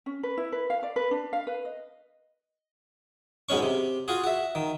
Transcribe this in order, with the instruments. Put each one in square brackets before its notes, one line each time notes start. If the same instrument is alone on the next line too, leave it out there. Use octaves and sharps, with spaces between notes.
[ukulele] C#4
B4
E4
B4
F5
D5
B4
D4
F5
B4
D#5
[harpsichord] G#2 B2 G#3 C#4 C#6
C3
F4 F#4 G#4
F#4 E5
D#3